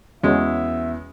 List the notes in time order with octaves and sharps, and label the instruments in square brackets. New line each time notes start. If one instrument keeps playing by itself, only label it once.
[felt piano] E2 [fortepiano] G#3 [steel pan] C#4 F#4 C#5 [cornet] E5